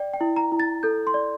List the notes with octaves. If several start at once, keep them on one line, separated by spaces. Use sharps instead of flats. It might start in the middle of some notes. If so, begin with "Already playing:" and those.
Already playing: D5 G5
G5
E4
A#5
E4
A6
A4 G6
C6
D5